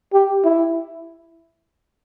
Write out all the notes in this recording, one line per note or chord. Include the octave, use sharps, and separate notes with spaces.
G4
E4